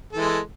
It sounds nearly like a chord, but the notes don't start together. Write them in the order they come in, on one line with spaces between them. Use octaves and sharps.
A4 E3 G#3